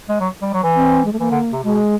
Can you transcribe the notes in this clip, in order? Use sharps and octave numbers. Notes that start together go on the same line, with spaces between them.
G#3
F#3
G3
F#3
E3
C4
G#3
A3
E3 A#3
D3
C3
B2 G#3